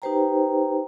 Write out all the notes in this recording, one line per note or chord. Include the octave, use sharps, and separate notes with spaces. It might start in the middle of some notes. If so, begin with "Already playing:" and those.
D#4 G4 B4 C5 G5 A#5